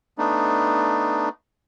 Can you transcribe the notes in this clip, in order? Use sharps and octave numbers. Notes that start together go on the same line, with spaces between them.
A3 B3 D4 D#4